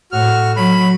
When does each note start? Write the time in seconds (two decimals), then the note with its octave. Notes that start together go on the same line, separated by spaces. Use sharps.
0.12 A2 F#4 F6
0.56 F#3 B5